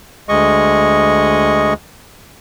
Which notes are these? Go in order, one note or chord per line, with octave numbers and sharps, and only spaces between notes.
D2 G#3 D#5 C#6